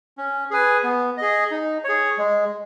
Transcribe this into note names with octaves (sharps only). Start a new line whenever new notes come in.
C#4
G#4 B4 G#5
B3
G#4 D#5
D#4
G#4 C#5
G#3